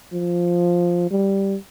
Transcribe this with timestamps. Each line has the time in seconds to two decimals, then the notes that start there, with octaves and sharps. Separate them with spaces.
0.13 F3
1.11 G3